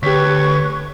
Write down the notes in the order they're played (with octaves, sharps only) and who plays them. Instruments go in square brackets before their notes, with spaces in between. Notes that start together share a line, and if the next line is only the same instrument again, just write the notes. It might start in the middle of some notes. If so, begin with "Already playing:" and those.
[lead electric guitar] D2 [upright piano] G4 B6 [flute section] B4 C#5 C#6